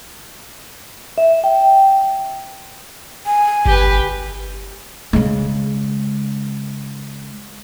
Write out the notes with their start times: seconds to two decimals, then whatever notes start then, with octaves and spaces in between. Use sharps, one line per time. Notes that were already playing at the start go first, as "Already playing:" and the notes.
1.18 E5
1.44 G5
3.26 G#5
3.66 G1 G4 B4
5.13 C#3 G#3